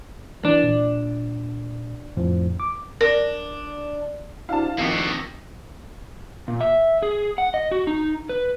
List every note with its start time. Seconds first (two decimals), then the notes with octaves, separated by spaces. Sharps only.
0.45 E3 D4 E4
0.63 A#2
2.17 F2 A2 F3
2.60 D6
3.01 D4 A#4 A#6
4.49 C3 D4 E4 F#4 F5 A5
4.79 D2 C3 D#3 F3 A#3 F#4 B6
6.48 A#2
6.61 E5
7.02 G#4
7.38 F#5
7.54 D#5
7.71 F#4
7.87 D#4
8.29 B4